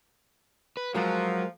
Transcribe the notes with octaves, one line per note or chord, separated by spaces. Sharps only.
B4
F3 F#3 G#3 A#4